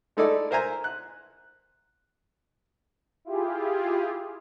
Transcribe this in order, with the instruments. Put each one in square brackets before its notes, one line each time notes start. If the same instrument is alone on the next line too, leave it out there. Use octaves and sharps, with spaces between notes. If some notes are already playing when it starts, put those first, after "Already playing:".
[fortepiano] G#3 A3 D#4 E4 A4 D5
A#4 C5 E5 G#5 A#5
F#6
[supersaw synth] E4 F4 G4 G#4